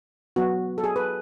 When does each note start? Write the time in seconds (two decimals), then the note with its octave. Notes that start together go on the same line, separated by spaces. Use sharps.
0.36 F#3 B3 F#4
0.78 A4
0.84 G#4
0.96 B4